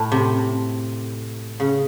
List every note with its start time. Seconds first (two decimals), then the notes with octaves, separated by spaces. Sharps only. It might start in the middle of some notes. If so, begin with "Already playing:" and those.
Already playing: A2
0.12 C3
1.60 C#3